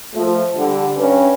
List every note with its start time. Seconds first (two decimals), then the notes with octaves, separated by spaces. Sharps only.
0.14 F3 A3
0.56 D3 G3
0.97 G2 C#4 B4